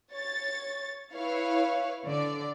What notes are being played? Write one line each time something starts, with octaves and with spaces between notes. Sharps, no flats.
C#5 A6
E4 B4 C#5 F5
D3 D5